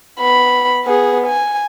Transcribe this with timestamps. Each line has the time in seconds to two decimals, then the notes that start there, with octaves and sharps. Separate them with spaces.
0.20 B3 B5
0.84 B3 G#4
1.27 G#5